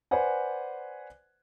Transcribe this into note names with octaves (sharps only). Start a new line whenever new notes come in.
B4 C5 D5 F#5 G#5